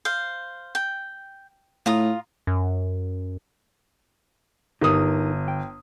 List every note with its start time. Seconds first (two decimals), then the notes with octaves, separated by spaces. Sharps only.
0.05 C5 F5
0.75 G5
1.86 A2 F4 A#5 D#6
2.47 F#2
4.81 G1 D#4 G4 A#4 D#6
5.48 G5